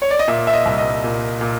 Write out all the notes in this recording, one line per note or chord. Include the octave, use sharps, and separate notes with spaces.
C#5
D5
D#5
A#2 E5
E5
D#5
C2
D#5
A#2
A#2